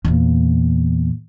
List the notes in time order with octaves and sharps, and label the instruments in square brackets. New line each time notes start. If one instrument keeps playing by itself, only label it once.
[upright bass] E2 A#2